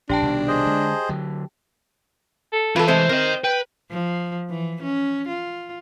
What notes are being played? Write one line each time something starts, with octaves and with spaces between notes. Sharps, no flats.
A#1 D4 G4 G5 A5
C2 B2 D#3
G#4 C5 D#5
D3 G#3
D3 F#3
A4
E3 F4 A4 B4
C3 G#3 A3 C5
C4 A#4 D#5
B4 G5
F3
E3
C#4
F4